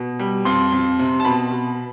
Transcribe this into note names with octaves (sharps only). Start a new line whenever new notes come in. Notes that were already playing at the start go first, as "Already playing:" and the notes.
Already playing: B2
G3
F2 C6
F2
C3
A5
B2 B5
B2